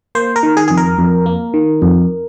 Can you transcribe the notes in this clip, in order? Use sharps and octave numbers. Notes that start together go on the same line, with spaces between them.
A#3 C5
A#4
D#3
G#4
F2 G#4
A#4
F2
A#3
D#3
F2